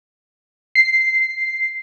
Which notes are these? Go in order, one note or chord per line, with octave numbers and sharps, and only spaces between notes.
C7